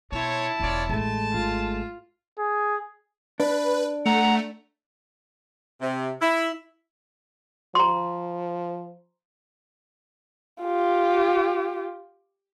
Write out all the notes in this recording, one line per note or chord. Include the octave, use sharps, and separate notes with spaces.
B2 C4 E4 C#5 A5
E1 B2 F4 C#5 D5
A1 G#3 A3 A5
G#1 F4
G#4
D4 B4
A3 F#5 A#5
C3
E4
F3 A#5 C6
F4 G4